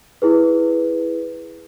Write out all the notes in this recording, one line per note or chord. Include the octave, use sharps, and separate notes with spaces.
E4 G#4 B4